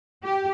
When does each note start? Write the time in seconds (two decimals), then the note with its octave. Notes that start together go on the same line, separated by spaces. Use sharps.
0.24 G4